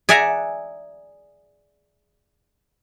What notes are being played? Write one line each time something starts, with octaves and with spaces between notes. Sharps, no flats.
G#4 D5 E5 F#5 G#5 A#5